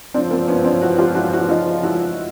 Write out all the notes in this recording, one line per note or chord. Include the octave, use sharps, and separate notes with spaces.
E2 C#3 F3 C4 D4
A#3 C4
B3 C#4
C4 D4
E4 F#4
F4 G4
E4 F#4
E4 F#4
D#4 F4
E4 F#4